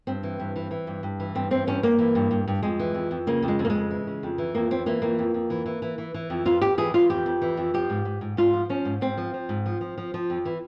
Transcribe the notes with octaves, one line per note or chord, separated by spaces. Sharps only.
G2 C4
E3
G2
E3
E3
G2
G2
E3
G2 C4
E3 C4
G2 C#4
G2 A#3
E3
G2
G2
G2
F2 G#3
E3
F2
F2
C#3 A#3
F2
G#3
F2
A#3
G#3
C#3
E3
C#3
F2
E3
F2 A#3
E3 C4
E3 A#3
F2 A#3
F2
F2
E3
E3
E3
E3
E3
F2
F2 F4
F2 G4
E3 G#4
E3 F4
F2 G4
F2
E3
F2
F3 G4
G#2
G#2
G#2
G#2 F4
F3
F3 C#4
G#2
G#2 C4
F3
F3
G#2
F3
F3
F3
F3
F2
E3